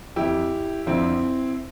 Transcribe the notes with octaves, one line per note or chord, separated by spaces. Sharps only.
F2 E3 E4 G4
F2 D3 F3 C4 E4